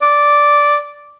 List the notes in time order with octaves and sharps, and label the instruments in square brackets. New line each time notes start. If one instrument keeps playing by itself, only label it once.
[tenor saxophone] D5